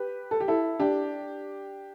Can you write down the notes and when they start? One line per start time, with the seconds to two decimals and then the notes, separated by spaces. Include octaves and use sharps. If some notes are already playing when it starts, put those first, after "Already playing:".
Already playing: G4 B4
0.31 A4
0.40 G4
0.48 E4 A4
0.79 D4 G4